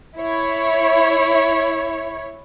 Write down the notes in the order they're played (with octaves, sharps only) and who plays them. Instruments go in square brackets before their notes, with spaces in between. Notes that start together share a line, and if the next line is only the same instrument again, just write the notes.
[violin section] E4 C#5